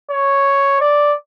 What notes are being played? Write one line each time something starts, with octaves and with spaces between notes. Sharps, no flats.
C#5
D5